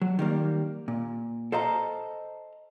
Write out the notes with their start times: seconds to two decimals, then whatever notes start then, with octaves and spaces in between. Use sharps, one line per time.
0.02 F#3
0.19 D#3 G3 A#3
0.88 A#2
1.52 A4 C5 D#5 F5 A#5